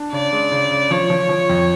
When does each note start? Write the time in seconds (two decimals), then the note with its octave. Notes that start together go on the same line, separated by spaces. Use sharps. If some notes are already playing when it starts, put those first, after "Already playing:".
Already playing: D4
0.12 C#3 D5
0.33 G#3
0.51 C#3
0.71 C#3
0.91 F3 C#5
1.10 F3
1.29 F3
1.50 F2